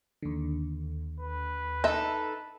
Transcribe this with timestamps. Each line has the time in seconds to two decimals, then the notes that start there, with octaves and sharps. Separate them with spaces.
0.22 D#2 D3
1.20 B4
1.84 D#4 A4 D#5 E5